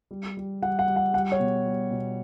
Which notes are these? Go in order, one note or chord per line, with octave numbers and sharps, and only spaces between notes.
G3
G3
G3 F#5
F#5
G3
F#5
G3 F#5
C#5
B2
G3
B2